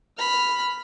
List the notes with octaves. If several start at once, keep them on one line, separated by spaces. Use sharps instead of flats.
B5 F6